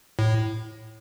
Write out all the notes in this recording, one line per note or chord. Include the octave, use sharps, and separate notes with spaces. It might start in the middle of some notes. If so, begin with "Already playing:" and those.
A2